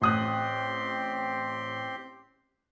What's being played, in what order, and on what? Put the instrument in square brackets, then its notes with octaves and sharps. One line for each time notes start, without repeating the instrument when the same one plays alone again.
[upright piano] A1 D#6 F#6 [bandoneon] C4 G4 C6